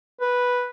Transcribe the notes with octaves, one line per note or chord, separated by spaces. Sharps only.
B4